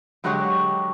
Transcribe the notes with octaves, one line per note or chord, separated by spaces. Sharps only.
D3 F#3 G#3 F#4 G4 C#5